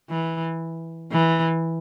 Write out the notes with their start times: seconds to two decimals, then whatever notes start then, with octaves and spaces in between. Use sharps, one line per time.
0.10 E3
1.12 E3